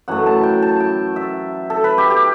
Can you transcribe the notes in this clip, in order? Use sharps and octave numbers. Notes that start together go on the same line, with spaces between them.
F#2 E3 A3 F#5
A5
G5
A5
G5
E5
A4
B4
G4
G4